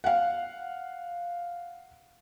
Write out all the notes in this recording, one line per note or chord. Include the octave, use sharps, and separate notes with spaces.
F5 F#5